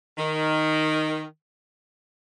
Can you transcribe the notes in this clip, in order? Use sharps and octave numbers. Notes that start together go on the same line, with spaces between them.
D#3